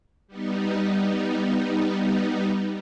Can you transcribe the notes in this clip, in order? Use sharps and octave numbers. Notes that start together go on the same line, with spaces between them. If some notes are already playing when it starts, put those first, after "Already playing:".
G3 B3 D#4